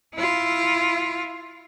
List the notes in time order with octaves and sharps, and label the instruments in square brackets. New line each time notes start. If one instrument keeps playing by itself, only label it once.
[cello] E4 F4